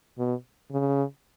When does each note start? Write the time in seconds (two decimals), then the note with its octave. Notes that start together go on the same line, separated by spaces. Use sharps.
0.18 B2
0.71 C#3